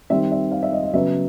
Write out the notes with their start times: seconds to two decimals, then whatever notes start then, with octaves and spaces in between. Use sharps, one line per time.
0.10 D#3 G3 C4 E5
0.31 E5
0.51 F5
0.63 E5
0.72 D#5
0.84 D#5
0.93 C#3 F#3 B3 E5